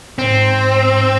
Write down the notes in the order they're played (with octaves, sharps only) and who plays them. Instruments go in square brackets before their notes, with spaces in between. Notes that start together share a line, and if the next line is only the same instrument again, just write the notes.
[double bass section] G#2 [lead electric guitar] C4